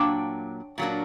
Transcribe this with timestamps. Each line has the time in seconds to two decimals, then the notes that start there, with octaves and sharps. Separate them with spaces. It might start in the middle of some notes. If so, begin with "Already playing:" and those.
Already playing: A#2 F#3 A#3 D4 G5
0.78 A#2 F#3 A#3 D4